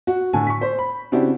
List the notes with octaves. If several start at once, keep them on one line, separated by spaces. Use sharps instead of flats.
F#4
A2 D3 G#5 A5
C#6 B6
C5
B5
C#3 C4 D4 E4 F#4 G4